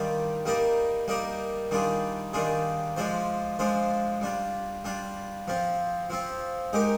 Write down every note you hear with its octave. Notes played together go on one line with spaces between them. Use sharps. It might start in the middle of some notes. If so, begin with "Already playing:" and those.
Already playing: D#3 G3 D4 F4
G3 A#3 D#4 A#4 D5
G3 A#3 D#4 A#4 D5
D#3 G3 D4 F4 G#4
D#3 G3 D4 F4 G#4
F3 G#3 D4 F4 C5
F3 G#3 D4 F4 C5
G3 D4 F4
G3 D4 F4
F3 C4 F4
F3 C4 F4
G#3 D#4 G4 A#4